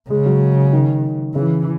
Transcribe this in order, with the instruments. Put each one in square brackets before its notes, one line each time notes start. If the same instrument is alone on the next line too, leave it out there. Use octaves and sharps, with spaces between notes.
[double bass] C#3 [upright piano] G#3
[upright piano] F#3
D#3
[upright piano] C#3 [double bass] E3